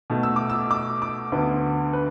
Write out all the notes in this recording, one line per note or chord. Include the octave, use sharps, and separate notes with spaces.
B2 A3
E6
D6
E6
D6
D6
D2 D3 B3
B4